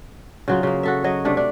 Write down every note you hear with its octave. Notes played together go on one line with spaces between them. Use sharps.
C#3 F#3 F4
C#3 A#3
F#4 A4 E5
F#3 C#5 D#5
C3 A3 D4
D4